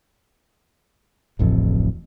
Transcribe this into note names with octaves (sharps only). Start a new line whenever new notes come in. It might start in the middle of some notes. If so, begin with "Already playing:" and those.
D1 A1 F2